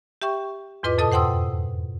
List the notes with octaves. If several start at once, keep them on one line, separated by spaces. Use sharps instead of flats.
G4 E5 G5 C#6
E2 G#2 F4 B4 D#5 D6
F2 B2 A4 D#5 A5 D#6
C5 F#5 G5 C6 D#6 E6